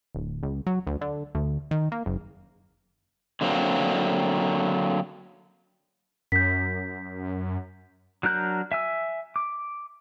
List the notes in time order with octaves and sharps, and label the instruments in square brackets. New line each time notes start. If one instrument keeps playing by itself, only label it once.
[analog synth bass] D1
C#2
F#3
D2
D3
D2
D#3
A#3
F#1
[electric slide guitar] D3 F#3 A#3 C4
[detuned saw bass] F#2 [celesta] G6 B6
[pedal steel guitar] F#3 D4 A#4 F#6 G6
E5 G#5 E6
D6